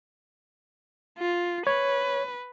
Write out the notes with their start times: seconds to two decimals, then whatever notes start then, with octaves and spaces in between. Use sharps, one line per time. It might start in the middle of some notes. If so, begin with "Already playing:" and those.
1.19 F4
1.67 B4 C#5